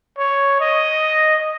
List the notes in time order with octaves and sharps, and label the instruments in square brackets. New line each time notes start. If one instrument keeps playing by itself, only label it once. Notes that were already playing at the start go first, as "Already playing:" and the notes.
[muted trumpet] C#5
D#5